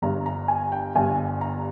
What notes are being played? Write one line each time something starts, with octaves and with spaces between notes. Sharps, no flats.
G1 G2 D3 A#5
A#5
G#5
G5
G1 G2 D3 G#5
A#5